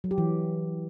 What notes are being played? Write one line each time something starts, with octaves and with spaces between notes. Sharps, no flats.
F#3
G4
E3